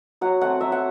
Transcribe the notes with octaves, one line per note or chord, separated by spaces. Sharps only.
F#3 F#5
A3 C4 F#5
F#3 E5
F#5